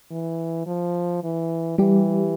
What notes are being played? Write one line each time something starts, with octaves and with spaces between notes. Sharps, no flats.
E3
F3
E3
E3 G3 G4